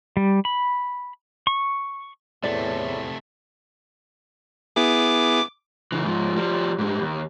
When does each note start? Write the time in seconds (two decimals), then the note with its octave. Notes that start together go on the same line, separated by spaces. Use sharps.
0.17 G3
0.45 B5
1.47 C#6
2.44 E2 A2 C3 A3 D5
4.76 B3 E4 G#4 D6
5.92 C#3 E3
6.04 G#2 F3
6.36 F3 G3
6.79 G#2 G3
7.01 D#2